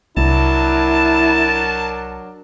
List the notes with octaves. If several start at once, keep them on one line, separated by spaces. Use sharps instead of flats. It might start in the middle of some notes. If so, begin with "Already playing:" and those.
C2 F#3 D4 E4 A#4 A5